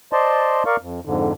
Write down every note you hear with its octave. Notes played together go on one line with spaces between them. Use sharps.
C5 D5 D#5 A5 C6
A#4 D5 F5 C#6
F2
F2 G#2 D3